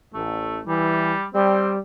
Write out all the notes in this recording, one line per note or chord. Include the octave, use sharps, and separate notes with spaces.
A1 A3
E3 G3
G3 C4